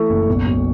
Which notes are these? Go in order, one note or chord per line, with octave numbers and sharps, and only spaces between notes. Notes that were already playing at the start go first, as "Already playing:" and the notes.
Already playing: E3 A3 C#6
F#1
B1
B1